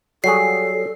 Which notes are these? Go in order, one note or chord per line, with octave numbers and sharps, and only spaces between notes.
F#3 G3 G#4 A4 C7